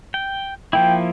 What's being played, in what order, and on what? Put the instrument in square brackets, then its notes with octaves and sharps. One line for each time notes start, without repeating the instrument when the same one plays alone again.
[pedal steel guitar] G5
[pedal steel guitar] F3 A#3 E4 [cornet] G5